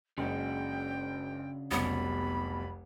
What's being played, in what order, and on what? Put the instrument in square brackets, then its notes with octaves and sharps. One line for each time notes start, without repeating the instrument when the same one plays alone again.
[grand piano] F#1 G#3 [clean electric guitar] C#3 D4 F#4 [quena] G5
[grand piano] F1 C2 F#3 [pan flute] B3 [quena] B5